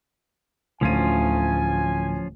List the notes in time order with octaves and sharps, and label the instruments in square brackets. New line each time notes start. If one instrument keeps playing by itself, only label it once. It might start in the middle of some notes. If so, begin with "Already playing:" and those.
[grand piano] D1 D#7 [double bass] D2 [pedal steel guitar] F3 C#4 F4 [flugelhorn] G#5